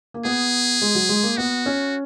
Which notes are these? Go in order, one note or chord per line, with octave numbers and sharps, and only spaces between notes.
A#3
B3 G#4
G#3
F#3
G#3
A#3
B3 F#4
C#4